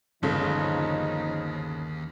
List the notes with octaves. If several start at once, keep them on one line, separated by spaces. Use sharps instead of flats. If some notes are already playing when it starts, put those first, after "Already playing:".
G1 D#2 C#3 F3 D#4